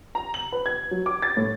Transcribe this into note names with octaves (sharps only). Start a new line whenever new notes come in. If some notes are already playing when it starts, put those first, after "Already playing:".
A#5
F#7
B4
G#6
F#3
D6
A6
A2